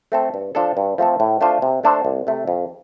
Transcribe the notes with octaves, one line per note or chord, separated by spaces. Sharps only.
A3 C4 A4
G2
F3 D4 A4
G2
F3 A3 C4 A4
A2
A3 D4 F4 C5
C3
A3 D4 A4 C5
C2
C3 A3 C4
F2